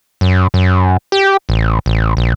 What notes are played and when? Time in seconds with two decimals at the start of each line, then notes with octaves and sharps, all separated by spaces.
0.21 F#2
0.54 F#2
1.12 G4
1.49 A1
1.86 A1
2.17 A#1